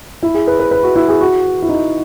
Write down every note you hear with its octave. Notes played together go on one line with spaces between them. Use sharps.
E4
G#4
B4
B4
B4
F#4
E4
G#4
F#4
E4
D#4